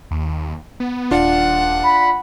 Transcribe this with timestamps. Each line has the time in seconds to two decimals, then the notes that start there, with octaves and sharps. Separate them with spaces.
0.11 D#2
0.80 B3
1.11 D#1 D4 F4 F#5
1.83 B5